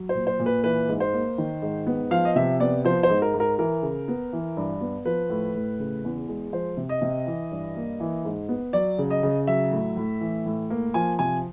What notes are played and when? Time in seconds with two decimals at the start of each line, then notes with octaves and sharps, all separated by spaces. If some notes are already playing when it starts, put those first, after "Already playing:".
Already playing: F#3
0.09 C5
0.15 A#2
0.27 C5
0.39 A#2
0.46 B4
0.64 E3 B4
0.89 G#2
1.00 C5
1.13 A#3
1.38 D#3
1.62 G#2
1.87 B3
2.11 F3 F5
2.25 D#5
2.36 C3 E5
2.60 B3 D5
2.84 F3 C5
3.03 C5
3.10 G#2
3.22 A#4
3.34 G#2
3.40 A#4
3.59 E3 A#4
3.82 C#3
4.08 B3
4.33 E3
4.57 G2
4.81 B3
5.05 F3 B4
5.30 A2
5.54 A2
5.79 C#3
6.04 E2
6.28 G#3
6.52 F3 C5
6.77 C3
6.89 D#5
7.02 C3
7.27 E3
7.51 G2
7.76 A#3
8.00 E3
8.25 G#2
8.49 B3
8.73 F#3 D5
8.98 C#3
9.10 D#5
9.23 C#3
9.47 F#3 E5
9.72 A2
9.97 A2
10.21 E3
10.46 A2
10.70 A#3
10.94 F3 G#5
11.19 C3 G#5